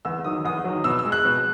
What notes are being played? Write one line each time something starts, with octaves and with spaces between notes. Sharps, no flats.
E2 E6
D#3 F#3 D#6
E2 D#6
D#3 F#3
B2 E6
E6
G#3
F#6
B2